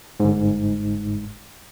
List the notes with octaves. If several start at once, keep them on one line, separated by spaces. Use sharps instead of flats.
G1 G#2